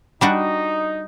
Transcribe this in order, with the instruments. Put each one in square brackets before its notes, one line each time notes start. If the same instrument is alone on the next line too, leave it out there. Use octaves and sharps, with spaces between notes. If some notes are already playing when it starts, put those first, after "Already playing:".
[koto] G3 D4 F#4 [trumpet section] D#4